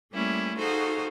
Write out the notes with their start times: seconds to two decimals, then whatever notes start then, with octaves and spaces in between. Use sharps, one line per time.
0.12 G3 A3 A#3 C#4 E4
0.57 D#4 F#4 G#4 A4 C5 F5